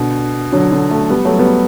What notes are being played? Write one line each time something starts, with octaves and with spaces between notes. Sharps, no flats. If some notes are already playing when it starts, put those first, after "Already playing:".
Already playing: B2 D3
D3 F#3
D3 F#3
F#3 A3
G3 B3
F#3 A3
G3 B3